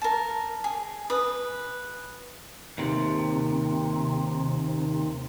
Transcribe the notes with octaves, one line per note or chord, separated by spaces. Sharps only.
A#4 A5
G#4
B4 D#6
D#2 C3